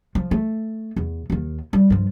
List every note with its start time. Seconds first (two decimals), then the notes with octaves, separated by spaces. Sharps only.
0.15 F3
0.31 A3
0.96 E2
1.30 D#2 D#3
1.73 G3 E4
1.90 G2 F3